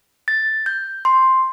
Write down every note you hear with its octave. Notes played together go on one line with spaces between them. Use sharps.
A6
G6
C6